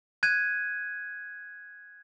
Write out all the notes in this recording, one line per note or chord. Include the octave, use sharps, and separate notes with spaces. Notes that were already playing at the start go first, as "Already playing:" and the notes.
F#6 G#6 D#7